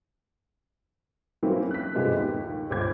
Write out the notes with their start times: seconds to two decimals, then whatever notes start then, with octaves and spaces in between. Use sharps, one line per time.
1.43 E3 F#3 A#3 C4 C#4 E4
1.71 F#6 B6
1.95 G2 C3 F3 G#3 A3 B3
2.18 D#2
2.70 G1 C#2 C5 D6 G#6